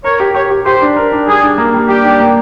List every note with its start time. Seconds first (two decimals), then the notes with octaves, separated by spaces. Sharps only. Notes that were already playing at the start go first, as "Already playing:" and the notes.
0.04 A#4 C#5
0.20 G4
0.35 G4 C#5
0.50 G4
0.66 G4 C5
0.82 D4
0.96 A#4
1.12 D4
1.28 G3 G#4
1.42 D4
1.58 A#3
1.74 G3
1.88 G3 G4
2.04 D4
2.20 A#3